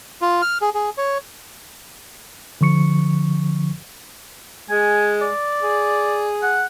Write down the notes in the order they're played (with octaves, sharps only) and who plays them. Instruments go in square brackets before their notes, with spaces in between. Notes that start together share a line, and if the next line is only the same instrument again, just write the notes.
[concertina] F4
F6
G#4
G#4
C#5
[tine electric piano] D3 F3 C#6 C#7
[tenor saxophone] G#3 [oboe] G#5
[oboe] D5
[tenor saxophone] G#4
[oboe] F#5